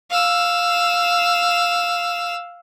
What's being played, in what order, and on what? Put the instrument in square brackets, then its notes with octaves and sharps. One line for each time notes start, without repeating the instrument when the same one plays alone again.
[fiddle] F5 E6